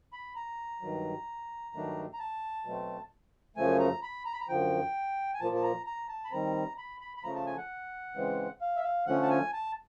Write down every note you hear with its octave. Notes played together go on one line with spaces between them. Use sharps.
B5
A#5
G2 D#3 F#3
G2 D#3 F#3 A3 D4
A#5
A5
B2 F#3 A3 C4
F#2 C#3 F3 A3 G#5
A#5
B5
A#5
B5
A#5
F#2 D3 F3 G5
G#5
A#2 F3 A#3 A5
A5
A#5
A#5
A5
B5
D#3 G3 C4 A#5
B5
B5
B5
C#3 F3 A3 A#5
A5
G#5
F#5
C#3 E3 G#3 C4
F5
E5
F5
D3 F3 A3 C#4 F#5
A5
G#5
A5